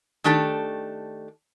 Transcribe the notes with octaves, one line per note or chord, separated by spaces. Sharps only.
D#3 A3 D4 G4 A4 A5